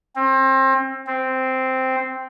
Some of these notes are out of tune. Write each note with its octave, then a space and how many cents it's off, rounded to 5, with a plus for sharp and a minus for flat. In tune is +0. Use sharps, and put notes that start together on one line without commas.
C4 +30
C4 -5